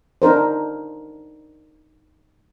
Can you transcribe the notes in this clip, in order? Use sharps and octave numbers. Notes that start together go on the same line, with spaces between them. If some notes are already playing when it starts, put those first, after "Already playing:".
D4 D#4 A#4 C5